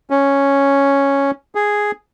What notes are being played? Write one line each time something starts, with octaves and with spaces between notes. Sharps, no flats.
C#4
G#4